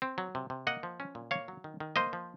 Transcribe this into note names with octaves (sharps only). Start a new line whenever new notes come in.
C4
F#3
C3
C3
A#3 D#5 F#5
F3
C#4
A#2
A#3 C#5 F5
F#3
D#3
D#3
A#3 C5 D#5
F3